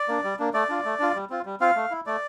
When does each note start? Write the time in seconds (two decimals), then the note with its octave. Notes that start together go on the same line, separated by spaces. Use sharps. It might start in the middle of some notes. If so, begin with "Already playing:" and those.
Already playing: D5
0.08 A#3 D4
0.24 G3
0.39 A#3 D4
0.54 A3 D5
0.69 D4 F4
0.85 A3
1.00 D4 F4
1.15 G3
1.30 C4 F4
1.46 G3
1.60 C4 F4 F5
1.76 A3
1.91 E4
2.06 A3 D5